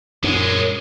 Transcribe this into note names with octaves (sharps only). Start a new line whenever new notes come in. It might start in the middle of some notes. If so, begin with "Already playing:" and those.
F#2 A#2 G#3